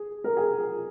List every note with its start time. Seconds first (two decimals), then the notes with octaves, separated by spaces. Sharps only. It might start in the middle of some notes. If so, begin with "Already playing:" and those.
Already playing: G#4
0.24 A#4
0.37 G#4